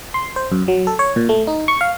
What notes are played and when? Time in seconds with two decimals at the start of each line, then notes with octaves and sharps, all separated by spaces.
0.14 C6
0.36 C5
0.52 F#2
0.68 F#3
0.87 A4
0.99 C#5
1.16 A#2
1.29 A3
1.47 D#4
1.68 C#6
1.81 F5